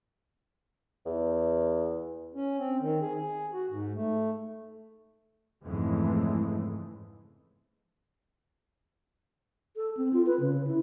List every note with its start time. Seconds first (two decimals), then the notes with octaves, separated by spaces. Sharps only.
1.06 E2
2.35 C#4
2.59 C4
2.81 D#3
3.02 G#4
3.16 G#4
3.53 F#4
3.70 G#2
3.95 A3
5.65 F2 G#2 C#3 E3 G#3 A3
9.76 A4
9.97 C4
10.13 F4
10.26 B4
10.40 C#3
10.67 E4